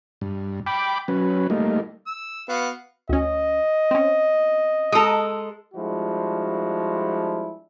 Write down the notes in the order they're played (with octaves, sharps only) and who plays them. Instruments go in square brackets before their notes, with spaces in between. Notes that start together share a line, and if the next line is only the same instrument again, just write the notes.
[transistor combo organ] G2
G5 B5 D6
F#3 C#4 B4
G3 A3 A#3 D#4
[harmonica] E6
[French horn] B3 [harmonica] F#4 F5 F#5
[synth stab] D2 C#4 [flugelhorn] D#5
[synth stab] C4 C#4
[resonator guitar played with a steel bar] G#3 A4 [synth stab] A#5 D#6
[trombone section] F3 G3 G#3 D4 E4 F#4